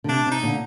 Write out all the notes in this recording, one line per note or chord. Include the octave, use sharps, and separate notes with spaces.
D3
C3 D4
C3
D#4
A#2 D3